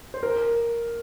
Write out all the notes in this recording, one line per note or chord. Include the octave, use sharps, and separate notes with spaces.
C5
A#4